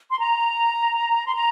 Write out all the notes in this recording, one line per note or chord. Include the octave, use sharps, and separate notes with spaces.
C6
A#5
C6
A#5